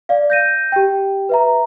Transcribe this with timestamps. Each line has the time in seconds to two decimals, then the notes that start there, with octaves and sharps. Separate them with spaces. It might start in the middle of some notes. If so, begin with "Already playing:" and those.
0.09 D5 F5
0.30 G6 A#6 D#7
0.72 G4 G5
1.29 B4 E5 A#5